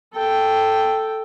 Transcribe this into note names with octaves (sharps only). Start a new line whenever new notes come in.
A4 G5